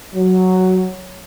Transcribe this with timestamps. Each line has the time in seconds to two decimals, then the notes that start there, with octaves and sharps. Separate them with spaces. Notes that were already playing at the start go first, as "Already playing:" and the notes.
0.14 F#3